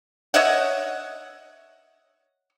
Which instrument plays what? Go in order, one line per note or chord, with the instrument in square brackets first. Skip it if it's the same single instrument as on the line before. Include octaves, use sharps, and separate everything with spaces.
[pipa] C#5 D#5 E5 F#5